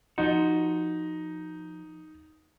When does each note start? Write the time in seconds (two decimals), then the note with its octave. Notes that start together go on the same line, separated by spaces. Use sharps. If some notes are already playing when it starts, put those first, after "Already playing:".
0.18 F3 D#4 F#4